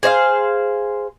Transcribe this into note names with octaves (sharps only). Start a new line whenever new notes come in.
G#4 C5 D#5 F5